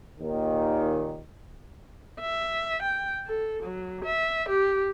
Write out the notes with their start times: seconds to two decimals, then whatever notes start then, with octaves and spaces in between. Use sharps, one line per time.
0.20 D#2 A#2 D#3
2.21 E5
2.83 G5
3.26 A4
3.63 F#3
4.05 E5
4.49 G4